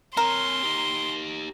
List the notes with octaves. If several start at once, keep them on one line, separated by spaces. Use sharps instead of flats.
C4 A#4 C#5 C6
D#4 G4